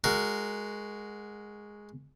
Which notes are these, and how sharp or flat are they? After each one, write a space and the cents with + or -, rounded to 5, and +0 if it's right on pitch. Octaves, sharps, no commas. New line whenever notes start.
G#3 +0 F#4 +0 A#4 -10